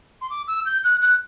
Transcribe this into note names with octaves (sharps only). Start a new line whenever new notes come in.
C6
D6
E6
G6
F#6
F#6